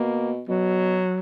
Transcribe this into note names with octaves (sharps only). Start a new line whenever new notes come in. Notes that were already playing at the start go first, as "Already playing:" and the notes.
Already playing: B2 A#3
B2 F#3